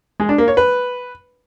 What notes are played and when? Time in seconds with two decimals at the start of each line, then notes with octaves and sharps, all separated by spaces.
0.20 G#3
0.29 D4
0.38 A#3
0.48 C#5
0.57 B4